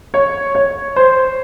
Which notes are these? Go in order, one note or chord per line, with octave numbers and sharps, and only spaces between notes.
C#5
C#5
C5